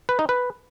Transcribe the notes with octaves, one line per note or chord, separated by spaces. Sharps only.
B4
D#4
B4